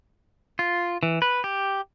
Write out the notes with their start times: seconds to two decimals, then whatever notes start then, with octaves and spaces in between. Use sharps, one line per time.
0.59 F4
1.03 E3
1.22 B4
1.44 G4